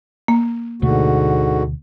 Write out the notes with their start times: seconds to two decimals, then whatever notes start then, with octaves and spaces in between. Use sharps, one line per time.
0.28 A#3
0.82 D2 G#2 B2 D3 A3 F#4